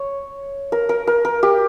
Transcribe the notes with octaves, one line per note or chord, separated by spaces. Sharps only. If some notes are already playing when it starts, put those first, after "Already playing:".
Already playing: C#5
A#4
A#4
A#4
A#4
G4